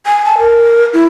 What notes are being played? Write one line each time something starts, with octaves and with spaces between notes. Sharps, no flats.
G#5
A5
A#4
E4